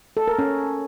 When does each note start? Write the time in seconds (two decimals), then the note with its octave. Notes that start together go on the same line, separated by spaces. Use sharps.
0.17 A4
0.28 A#4
0.38 C#4